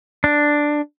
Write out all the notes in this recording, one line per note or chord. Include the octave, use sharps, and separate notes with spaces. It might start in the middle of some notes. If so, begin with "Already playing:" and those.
D4